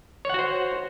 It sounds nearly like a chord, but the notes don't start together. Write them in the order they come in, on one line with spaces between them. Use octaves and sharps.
C#5 F#5 F#4 C5